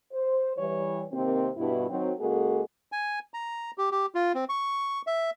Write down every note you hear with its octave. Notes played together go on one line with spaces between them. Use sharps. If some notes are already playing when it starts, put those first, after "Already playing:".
C5
E3 G3 C#5
C3 D#3 A#3 C4
G2 B2 E4
D#3 F#3 C4
C#3 G#3 A#3 F#4 G#4 A4
G#5
A#5
G4
G4
F4
C4
C#6
E5